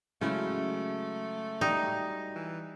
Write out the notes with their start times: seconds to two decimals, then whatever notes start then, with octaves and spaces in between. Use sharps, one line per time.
0.21 C#3 F#3 G#3 A3 E4
1.61 G3 D#4
2.35 E3